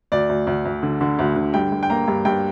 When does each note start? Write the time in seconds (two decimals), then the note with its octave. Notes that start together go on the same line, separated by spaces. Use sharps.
0.12 D2 D5
0.29 D2
0.47 D2
0.65 D2
0.83 D3
1.01 D3
1.19 D2
1.36 D3
1.54 G2 G5
1.72 G2
1.83 G5
1.90 A#3 A#5
2.08 G2
2.25 G2 G5